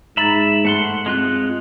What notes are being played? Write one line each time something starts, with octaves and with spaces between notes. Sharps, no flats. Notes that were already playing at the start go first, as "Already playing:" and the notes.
G#2 E5 A#5 B5 A6
G2 A3 F#5 C6
G#3 C4 F4 F#6